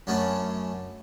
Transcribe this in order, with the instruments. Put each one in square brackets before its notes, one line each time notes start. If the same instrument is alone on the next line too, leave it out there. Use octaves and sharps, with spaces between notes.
[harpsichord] F#2 F#3 A3 B3 C#4 D4